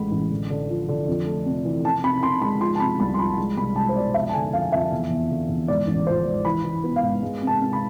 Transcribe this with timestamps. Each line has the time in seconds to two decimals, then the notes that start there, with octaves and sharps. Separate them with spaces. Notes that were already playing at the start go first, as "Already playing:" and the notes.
Already playing: A1 A2 G#3 B5
0.12 A1
0.31 D3
0.50 D3
0.69 F3
0.89 D3
1.08 F2
1.26 A3
1.46 C3
1.65 E3
1.85 C3 A5
2.04 C3 B5
2.22 C3 C6
2.41 G#3 B5
2.61 F3 C6
2.75 A5
2.80 C3 B5
3.00 C2 B5
3.14 C6
3.18 F3 B5
3.38 G#3
3.57 C2 B5
3.76 G#3 A5
3.89 C5
3.96 B2 D5
4.14 F2 E5
4.29 A5
4.33 D3 G#5
4.53 F2 F5
4.72 F2 E5
4.91 E2
5.10 E2
5.30 D3
5.49 E2
5.68 G#2 D5
5.88 A1
6.07 F3 C5
6.26 G#2
6.45 E3 B5
6.64 E3
6.84 B3
6.96 F5
7.03 G#2
7.23 G#3
7.42 C3
7.47 A5
7.61 C3
7.73 B5